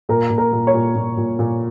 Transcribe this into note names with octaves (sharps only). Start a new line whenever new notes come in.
A#2 A#4
A#2
A#4
A#2
C#5
A#2
A#2
A#2
A#2